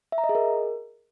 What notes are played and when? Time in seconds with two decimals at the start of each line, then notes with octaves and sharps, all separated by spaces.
0.12 E5
0.18 A#5
0.24 D#5
0.29 G#4
0.35 A#4